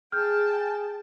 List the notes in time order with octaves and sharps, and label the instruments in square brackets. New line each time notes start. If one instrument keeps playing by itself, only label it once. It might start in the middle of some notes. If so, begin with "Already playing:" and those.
[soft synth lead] G#4 [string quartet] G5 A5 [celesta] F6 G6